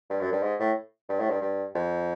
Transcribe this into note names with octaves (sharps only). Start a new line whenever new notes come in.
G2
F#2
G2
G#2
A2
G2
A2
G2
G2
F2